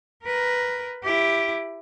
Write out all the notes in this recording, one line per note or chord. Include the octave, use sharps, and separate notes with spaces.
A#4 B4
E4 G4